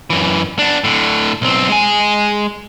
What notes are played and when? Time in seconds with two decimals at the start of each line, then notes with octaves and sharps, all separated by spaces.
0.10 F#2 E3
0.59 B3 D4
0.84 A2 D3
1.42 B1 C4
1.69 G#3 G#5